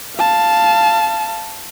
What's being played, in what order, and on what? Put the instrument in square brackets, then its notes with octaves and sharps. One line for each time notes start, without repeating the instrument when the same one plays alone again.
[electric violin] F5 A5